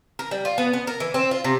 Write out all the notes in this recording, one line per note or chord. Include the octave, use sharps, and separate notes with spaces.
A#4
G3
F4
B3
B3
A#4
E3
C4
F4
C3